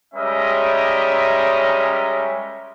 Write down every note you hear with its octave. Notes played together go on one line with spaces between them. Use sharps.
G3 G#3 C#4 A#4 D#5 E5